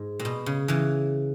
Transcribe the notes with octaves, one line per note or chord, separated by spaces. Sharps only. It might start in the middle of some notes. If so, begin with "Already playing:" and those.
Already playing: G#2
A#2
B2
C#3
C#3 E3